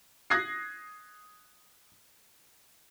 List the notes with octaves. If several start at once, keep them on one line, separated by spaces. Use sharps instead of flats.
D#6 F#6 G#6 A#6 C7